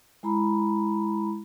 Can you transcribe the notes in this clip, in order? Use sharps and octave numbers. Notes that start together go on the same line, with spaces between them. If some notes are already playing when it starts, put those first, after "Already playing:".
G#3 E4 A#5 B5